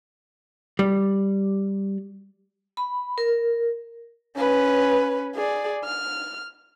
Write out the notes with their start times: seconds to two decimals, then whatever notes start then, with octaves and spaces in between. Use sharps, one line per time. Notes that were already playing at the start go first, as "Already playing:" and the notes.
0.79 G3
2.77 B5
3.18 A#4
4.37 C#4 B4
5.35 G#4 D5
5.85 F6